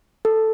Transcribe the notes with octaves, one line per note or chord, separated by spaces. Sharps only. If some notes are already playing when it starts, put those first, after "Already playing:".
A4